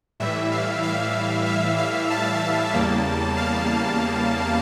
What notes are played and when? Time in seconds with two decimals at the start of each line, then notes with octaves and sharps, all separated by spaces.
0.20 A2 E3 G3 E5
0.52 F5
0.83 F5
1.46 E5
1.78 F5
2.10 A5
2.73 E2 C#3 G3 A#3
3.37 F5